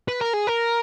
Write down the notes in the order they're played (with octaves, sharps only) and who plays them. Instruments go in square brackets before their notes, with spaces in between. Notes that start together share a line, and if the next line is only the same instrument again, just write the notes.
[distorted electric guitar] B4
A#4
G#4
A#4